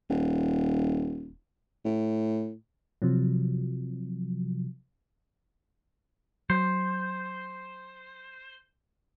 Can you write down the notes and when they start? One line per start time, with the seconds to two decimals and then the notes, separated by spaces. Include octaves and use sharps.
0.09 D#1
1.85 A2
3.02 C3 F3 F#3
6.50 F#3 C5